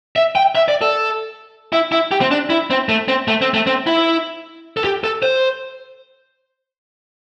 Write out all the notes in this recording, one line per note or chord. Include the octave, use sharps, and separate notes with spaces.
E5
G5
E5
D5
A4
E4
E4
G4
C4
D4
E4
C4
A3
C4
A3
C4
A3
C4
E4
A4
G4
A4
C5